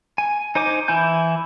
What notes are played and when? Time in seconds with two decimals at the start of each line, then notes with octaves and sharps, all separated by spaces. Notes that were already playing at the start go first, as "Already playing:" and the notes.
0.18 G#5
0.55 D#4 C5 G#5 D6
0.88 E3 E4 G#5 G6